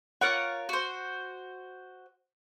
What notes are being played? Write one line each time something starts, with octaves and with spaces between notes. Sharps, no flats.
F4 A#4 C#5 F#5
F#4 C5